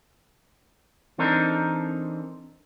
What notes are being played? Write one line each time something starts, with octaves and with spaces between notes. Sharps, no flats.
E3 C4 D4 D#4 A4 A#4